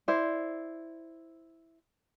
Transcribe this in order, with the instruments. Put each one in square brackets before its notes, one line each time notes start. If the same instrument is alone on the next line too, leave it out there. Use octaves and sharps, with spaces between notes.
[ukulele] E4 C5 D5